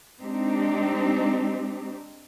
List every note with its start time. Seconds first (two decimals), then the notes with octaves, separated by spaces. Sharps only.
0.21 G#3 C4 D4 D#4 G4